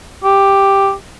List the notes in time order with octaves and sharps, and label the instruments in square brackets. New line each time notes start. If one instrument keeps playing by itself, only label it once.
[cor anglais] G4